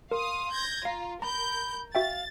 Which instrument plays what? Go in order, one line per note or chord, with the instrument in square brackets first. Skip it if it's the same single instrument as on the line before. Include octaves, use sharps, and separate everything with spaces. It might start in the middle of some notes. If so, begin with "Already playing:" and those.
[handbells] A#4 [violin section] F5 D#6 [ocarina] C6
[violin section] G6 G#6 A#6
[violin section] F4 [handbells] F5 [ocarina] A#5
[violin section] A#4 G6 [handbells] A#5 [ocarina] B5
[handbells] F#4 E5 G5 [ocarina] F5 [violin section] A6